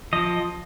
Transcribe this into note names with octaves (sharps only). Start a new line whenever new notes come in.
F3 D#5